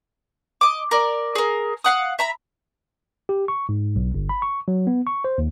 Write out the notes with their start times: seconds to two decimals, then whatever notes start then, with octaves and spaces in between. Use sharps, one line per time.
0.61 D#5 D6
0.91 A#4 D5
1.35 G#4 A#4
1.84 F5 F#5 D#6
2.19 E5 A#5 B5
3.29 G4
3.48 C#6
3.69 G#2
3.96 B1
4.14 G1
4.29 B5
4.42 C#6
4.68 F#3
4.87 B3
5.07 C#6
5.24 C5
5.38 D#2